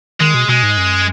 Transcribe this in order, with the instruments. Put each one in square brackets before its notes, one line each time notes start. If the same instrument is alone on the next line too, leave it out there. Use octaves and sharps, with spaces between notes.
[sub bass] D#3 [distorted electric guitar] G#3
[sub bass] B2
[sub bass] B2 [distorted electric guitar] G#3
[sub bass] G#2
F#2